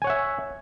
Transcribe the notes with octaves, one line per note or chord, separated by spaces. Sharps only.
C#5 E5 F#5 G#5